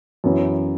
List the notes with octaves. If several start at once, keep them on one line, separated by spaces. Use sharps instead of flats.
F#2 E3 B3 E4